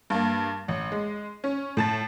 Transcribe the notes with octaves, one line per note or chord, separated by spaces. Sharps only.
G2 A#3
A1
G#3
C#4
A2 A5 A6